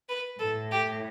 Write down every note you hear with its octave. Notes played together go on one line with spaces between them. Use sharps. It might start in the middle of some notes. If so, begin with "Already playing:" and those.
B4
A2 A4
G4